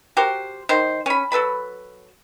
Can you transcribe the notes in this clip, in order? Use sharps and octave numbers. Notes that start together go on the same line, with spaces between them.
F#4 G4 A#4 C5
D#3 C5
C#4 B5
F#3 A4 B4 B5